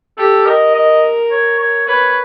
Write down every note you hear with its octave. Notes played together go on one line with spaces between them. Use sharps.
G4 A4
A#4 D#5
D#5
C#5
C#5
B4 C#5